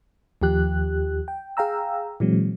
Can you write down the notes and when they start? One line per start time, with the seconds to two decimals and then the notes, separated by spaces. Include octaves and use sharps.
0.42 D#2 F3 G4 F#6
1.28 G5
1.57 G#4 F5 G5 A#5 E6
2.20 A#2 E3 F#3 G#3 C4